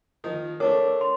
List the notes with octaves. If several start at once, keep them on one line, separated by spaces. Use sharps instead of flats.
D#3 F3 D#4
A3 D4 A#4 C#5 D6
C6